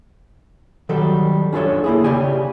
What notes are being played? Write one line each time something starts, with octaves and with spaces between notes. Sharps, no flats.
D#3 F#3 G3 A4
C#4 D4 F4 A4 C#5
A#3 E4 G#4
C#3 G4 D5 G#5